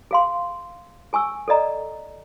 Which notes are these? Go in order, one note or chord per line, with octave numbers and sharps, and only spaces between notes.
G#4 F5 C6
G#4 G#5 C#6 E6
A4 D5 D#5 A#5